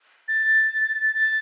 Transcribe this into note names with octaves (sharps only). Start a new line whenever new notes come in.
A6
A6